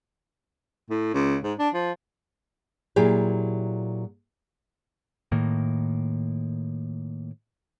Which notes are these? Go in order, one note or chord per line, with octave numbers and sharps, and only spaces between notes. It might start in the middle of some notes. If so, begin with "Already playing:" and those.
A2
C#2
G#2
D4
F3
A#2 F#3 E4 G4 G#4
A2 D#3 A#3